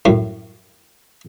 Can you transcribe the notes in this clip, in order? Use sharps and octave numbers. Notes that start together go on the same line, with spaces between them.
F#2 A2